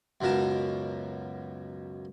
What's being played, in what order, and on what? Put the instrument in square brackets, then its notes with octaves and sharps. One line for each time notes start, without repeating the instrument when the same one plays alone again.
[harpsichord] C#2 F#2 B2 A#4 A5